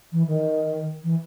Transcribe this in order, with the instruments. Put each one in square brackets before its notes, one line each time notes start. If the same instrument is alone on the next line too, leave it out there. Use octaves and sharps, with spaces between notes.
[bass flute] E3
D#3
E3